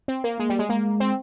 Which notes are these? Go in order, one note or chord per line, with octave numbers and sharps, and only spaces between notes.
C4
A#3
G#3 A#3
G3
G#3
G#3 A#3
C4